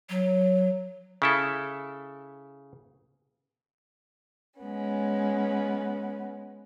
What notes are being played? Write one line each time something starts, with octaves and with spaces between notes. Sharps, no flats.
F#3
C#3 E4 A4
G#3 B3 C#4